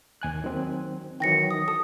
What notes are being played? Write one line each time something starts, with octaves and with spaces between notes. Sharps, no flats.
D#2 G#5 F#6
D#3 F#3 C4
D#3 E3 F#3 G5 A#6 C#7
D#6
A4 D#6